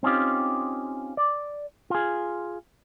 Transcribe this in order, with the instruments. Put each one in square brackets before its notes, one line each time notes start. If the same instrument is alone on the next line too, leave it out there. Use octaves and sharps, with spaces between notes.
[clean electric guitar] C4 C#4 D#4 F4 G4
D5
F4 G#4